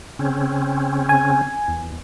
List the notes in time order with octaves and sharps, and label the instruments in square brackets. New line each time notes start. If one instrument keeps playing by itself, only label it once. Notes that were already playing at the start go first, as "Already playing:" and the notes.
[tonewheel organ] C#3 C4 C#4
[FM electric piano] G#5
[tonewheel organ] E2